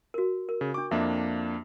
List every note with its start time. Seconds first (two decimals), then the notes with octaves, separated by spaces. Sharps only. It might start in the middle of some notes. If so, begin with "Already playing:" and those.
0.14 F#4 A#4
0.49 A#4
0.61 C#3
0.74 D4 C#6 D6
0.91 F2 A#3 D4 E5